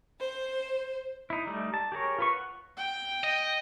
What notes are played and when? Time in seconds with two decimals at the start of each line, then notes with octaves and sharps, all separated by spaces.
0.20 C5
1.30 D#4 E4
1.47 G3 A3 D#4
1.74 A5
1.92 G4 G#4 A#4 C#5
2.18 F4 B4 C#6
2.33 F#5
2.77 G5
3.24 D#5